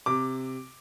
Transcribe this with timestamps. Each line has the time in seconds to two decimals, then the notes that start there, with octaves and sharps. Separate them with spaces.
0.06 C3 D6